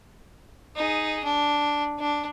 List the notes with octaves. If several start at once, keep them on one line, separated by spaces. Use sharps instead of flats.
D#4 G#4
D4
D4